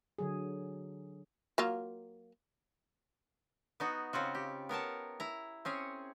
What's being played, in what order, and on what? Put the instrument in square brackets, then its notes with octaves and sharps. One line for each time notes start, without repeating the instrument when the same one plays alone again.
[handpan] D3 F#3 G#4
[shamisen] F#3 A#3 F4
[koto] B3 D#4 F#4
C#3 C4 F4 F#4
G4
B3 A#4 C#5 A5
E4 A#5
C4 C#4 G#4 C#5